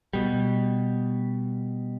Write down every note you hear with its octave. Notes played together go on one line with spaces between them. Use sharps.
B2 G3